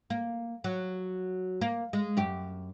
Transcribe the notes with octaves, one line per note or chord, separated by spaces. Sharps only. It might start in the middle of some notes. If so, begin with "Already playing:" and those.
A#3
F#3
A#3
G#3
F#2 G4